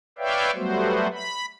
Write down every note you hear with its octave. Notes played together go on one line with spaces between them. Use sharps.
B4 C#5 D5 E5 F5 G5
F#3 G3 A3 B3 F#4 C5
B5